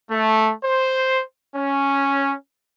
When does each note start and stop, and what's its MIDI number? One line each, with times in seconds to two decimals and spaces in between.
0.11 0.52 57
0.64 1.24 72
1.55 2.34 61